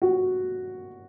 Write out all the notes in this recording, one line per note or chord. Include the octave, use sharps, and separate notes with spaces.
F#4